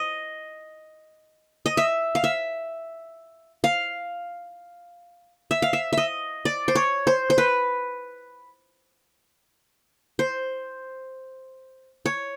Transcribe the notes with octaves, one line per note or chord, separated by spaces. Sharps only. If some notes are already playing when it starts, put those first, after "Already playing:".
Already playing: D#5
D#5
E5
F5
E5
F5
E5
F5
E5
D#5 E5
D5
C5
C#5
C5
C5
B4
C5
C#5